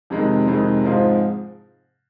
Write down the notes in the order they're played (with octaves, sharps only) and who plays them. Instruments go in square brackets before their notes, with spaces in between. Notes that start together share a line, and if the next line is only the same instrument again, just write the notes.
[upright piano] F2 C3 D#3 G#3
F2 C3 D#3 G#3
G#2 F3 G#3 C4 F4